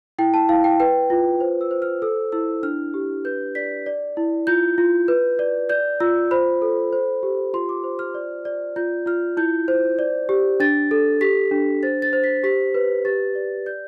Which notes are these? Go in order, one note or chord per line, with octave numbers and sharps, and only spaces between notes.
E4 G5
A5
E4 F5
G5
B4 G5
F4
C5
E6
C5
F6
A4 E6
E4 E6
D4 F6
G4
B4 G6
D5 B6
D5
E4
F4 G6
F4
B4
D5
D5 G6
F4 E6
C5 B5
A4
C5
G4
F4 C6
D6
C5
F6
D5
D5
F4 G6
F4 F6
E4 G6
C5
D5
G4
D4 A6
A4
G4 B6
D4
C5 A6
A6
C5
B6
G4 B6
B4
G4 A6
D5
D5 G6